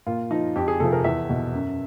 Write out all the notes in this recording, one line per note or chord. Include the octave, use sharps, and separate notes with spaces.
A#2 F4
F3 D#4
F2 G4
G#4
C3 F3 A4
A#4
E2 E5
B2
F#2